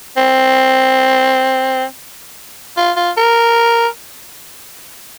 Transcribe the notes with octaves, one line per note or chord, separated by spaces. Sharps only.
C4
F4
F4
A#4